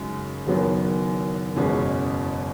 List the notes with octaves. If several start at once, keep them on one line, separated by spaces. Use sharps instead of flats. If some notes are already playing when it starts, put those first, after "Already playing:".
Already playing: F#2 C#3 G#3 D#4 F#4
F#1 F#2 D#3 F#3 B3
F#1 E2 B2 G#3 C#4